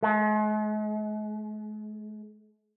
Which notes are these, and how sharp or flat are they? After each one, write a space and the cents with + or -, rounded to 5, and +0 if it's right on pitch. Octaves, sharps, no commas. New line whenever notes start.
G#3 +45